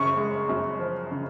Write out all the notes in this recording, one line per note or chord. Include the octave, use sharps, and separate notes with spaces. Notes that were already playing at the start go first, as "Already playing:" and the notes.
Already playing: F#2 C#3 C#6
G#3
F#2
F3
C#3